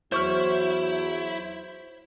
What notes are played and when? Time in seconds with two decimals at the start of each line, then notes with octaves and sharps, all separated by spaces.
0.12 E2 F#3 E4 C5 C#6 F6